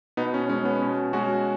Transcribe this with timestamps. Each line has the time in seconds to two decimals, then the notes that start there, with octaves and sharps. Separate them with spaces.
0.17 B2 B3 D#4
0.34 C#4
0.49 G#3 C#4
0.65 B3
0.82 B2 C#4
1.13 G#3 C#4 F#4